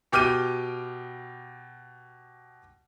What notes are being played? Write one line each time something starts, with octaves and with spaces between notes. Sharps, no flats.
B2 G4 D6 F6 G6 D#7